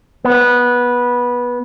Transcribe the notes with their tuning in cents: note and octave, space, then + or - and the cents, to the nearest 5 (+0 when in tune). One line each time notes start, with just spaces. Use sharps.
B3 -15